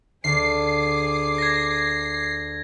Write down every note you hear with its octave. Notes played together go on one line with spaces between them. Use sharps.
D2 G#4 D6 C7
G#6 A#6